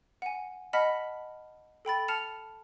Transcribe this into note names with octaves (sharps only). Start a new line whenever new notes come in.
F#5 G#5
D#5 F#5 A5 B5 F6 B6
A4 G5 B5 A6
A5 F6 C#7 E7 F7